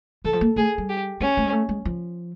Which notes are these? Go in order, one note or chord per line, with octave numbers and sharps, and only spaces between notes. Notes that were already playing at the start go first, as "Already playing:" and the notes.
E3 A4
F3
A#3
A3 G#4
G3
G4
G#3 C#4
A3
G#3
A3
G#3
F3